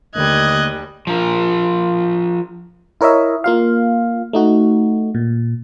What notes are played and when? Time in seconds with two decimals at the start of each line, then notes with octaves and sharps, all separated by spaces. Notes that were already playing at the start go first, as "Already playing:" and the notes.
0.15 D#2 D3 G3 A3 A#3 D#5 F#6 G#6
1.07 F3 A#4
3.01 E4 A#4 C#5 D#5 E5
3.44 A#3 F4 F5
4.33 A3 D#4 F#4
5.15 A#2